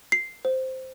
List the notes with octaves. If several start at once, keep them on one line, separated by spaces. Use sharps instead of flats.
C7
C5